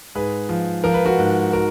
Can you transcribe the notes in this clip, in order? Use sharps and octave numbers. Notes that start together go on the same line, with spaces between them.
G#2 G#4 B4
F3
F3 A#4
B4
F#4 A#4
G#2
F#4 A#4